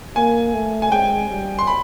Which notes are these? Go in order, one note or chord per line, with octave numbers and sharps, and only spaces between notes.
A#3 G#5
A3
G#5
G#3 G5
G3
C6
B5